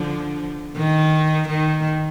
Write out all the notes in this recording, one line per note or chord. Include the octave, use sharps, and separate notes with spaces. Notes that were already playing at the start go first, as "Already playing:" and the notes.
Already playing: D3 F3
D#3
D#3